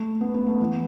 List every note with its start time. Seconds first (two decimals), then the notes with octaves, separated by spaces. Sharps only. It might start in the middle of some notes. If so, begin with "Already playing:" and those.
Already playing: A3
0.21 B3
0.34 B3
0.47 A3
0.60 E3